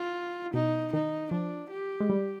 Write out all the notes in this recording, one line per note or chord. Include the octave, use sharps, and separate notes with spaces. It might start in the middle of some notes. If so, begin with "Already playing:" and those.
Already playing: F4
B2 D#4
D#3 D#4
F3 D4
G4
G#3
G3